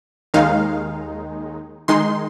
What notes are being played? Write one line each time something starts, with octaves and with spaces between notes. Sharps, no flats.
D#2 D#3 G#3 D#4 F5
D#3 G#3 D#4 C6